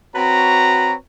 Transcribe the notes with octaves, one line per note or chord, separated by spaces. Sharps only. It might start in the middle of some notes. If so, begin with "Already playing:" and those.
C4 F#4 B4 C#5 A#5